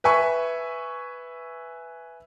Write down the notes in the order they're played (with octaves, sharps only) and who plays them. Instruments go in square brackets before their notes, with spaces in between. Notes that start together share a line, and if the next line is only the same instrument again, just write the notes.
[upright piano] B4 E5 G#5 C#6